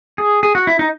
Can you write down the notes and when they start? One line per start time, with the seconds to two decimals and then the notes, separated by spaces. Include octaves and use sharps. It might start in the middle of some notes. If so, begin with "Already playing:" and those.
0.18 G#4
0.43 G#4
0.55 F#4
0.67 E4
0.79 D#4